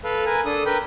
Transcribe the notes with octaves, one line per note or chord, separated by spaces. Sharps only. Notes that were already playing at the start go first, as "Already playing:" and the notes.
A4 B4 F5
A#4 B4 G#5
D4 A4 D#6
A#4 B4 G5 B5